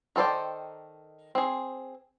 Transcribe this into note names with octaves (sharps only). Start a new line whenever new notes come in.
D#3 A4 C5 D5 G5
C4 G#4